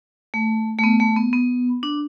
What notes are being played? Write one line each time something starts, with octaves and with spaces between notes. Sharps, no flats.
A3
A3
B3
A3
B3
B3
D4